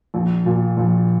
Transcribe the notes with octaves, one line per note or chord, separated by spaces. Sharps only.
A#1
A#2
A#1